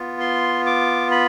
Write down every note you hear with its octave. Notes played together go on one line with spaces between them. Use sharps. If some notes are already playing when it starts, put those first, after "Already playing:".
Already playing: B3 F4
C6
D6
B5